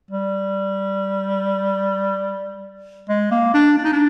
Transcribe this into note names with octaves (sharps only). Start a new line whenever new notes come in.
G3
G#3
A#3
D4
D4
D#4
D4